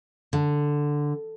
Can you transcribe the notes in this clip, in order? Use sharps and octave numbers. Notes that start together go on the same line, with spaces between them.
D3